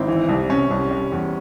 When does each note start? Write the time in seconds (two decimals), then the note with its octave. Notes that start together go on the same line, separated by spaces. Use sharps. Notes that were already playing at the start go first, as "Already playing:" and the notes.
Already playing: G#1 C4 E4
0.08 E3
0.29 C2
0.49 C3 C#4
0.71 C2
0.91 G3
1.12 E2